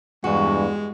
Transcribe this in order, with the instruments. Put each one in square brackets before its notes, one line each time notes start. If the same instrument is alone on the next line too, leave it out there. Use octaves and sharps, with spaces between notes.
[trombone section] E2 G2 [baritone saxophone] G#3 [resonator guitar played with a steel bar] F#4